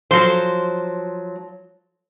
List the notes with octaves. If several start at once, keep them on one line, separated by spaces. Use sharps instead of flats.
F3 F#3 C5